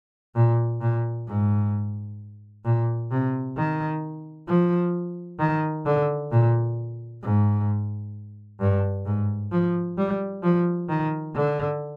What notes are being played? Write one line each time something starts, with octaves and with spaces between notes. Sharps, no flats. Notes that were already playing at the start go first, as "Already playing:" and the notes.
A#2
A#2
G#2
A#2
C3
D#3
F3
D#3
D3
A#2
G#2
G2
G#2
F3
G3
F3
D#3
D3